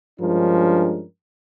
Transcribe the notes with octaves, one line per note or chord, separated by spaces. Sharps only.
G2 F3 G#3 C#4 D4 A#4